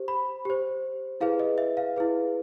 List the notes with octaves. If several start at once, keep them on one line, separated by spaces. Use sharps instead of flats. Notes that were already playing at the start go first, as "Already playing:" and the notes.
Already playing: G4 C5
B5
G4 C5
E4 G#4 B4 F5
D#5
E5
F5
E4 G#4 B4